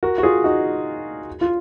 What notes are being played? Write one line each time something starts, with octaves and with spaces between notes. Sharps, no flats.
F#4 A#4
F#4
F4 G#4
D#4 F#4
F4